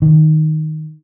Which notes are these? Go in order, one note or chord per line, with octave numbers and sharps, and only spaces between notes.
D#3